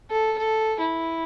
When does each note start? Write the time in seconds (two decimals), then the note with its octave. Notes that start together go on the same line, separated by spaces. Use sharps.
0.10 A4
0.38 A4
0.80 E4